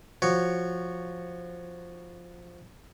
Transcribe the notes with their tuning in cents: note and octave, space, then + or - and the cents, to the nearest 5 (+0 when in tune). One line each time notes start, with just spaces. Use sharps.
F3 +0 F#4 +0 C#5 +0